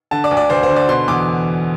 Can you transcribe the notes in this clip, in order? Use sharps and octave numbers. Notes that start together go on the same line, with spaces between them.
D3 A5
D5
D2
D5
D2 C5
C5
D3
D5
B2 C6
E2 D6